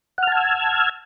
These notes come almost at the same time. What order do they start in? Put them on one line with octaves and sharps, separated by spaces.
F#5 F6 A5 G#6 E6